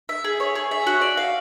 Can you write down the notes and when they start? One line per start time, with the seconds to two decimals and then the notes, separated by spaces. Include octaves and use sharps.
0.09 E5
0.24 G#4
0.40 C#5
0.55 G#4
0.71 E5
0.87 F#4
1.01 D5
1.17 F5